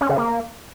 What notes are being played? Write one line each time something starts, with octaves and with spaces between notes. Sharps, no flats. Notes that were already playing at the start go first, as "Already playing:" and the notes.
C#4
C#3
A#3